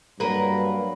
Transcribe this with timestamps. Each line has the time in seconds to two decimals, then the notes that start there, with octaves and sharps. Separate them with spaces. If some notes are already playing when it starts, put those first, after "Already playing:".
0.20 G2 F#3 A#3 A#4 B4